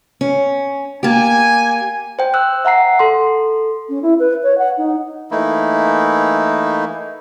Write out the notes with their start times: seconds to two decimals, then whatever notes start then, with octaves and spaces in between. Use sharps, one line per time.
0.21 C#4
1.03 A#3 G4 G#5
2.19 C5 G5
2.34 E6 F#6
2.65 E5 F#5 A#5 C7
2.99 A4 C6
3.89 C#4
4.02 E4
4.19 B4
4.43 C#5
4.58 F#5
4.78 D#4
5.31 E3 A3 A#3 D#4 E4